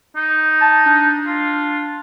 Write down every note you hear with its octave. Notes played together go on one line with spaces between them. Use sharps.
D#4
A5
D4
F4